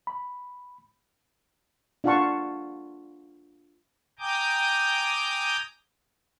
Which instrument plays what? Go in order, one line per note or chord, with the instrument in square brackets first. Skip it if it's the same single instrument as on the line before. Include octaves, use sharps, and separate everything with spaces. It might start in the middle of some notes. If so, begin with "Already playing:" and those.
[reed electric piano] B5
[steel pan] D4 F4 F5 F#5 A5 C#6
[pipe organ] G5 G#5 A#5 D6 D#6 G6